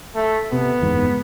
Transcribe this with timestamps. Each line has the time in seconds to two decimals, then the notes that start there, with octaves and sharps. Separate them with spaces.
0.15 A3
0.52 C3 B3
0.81 F#1 E2 G#2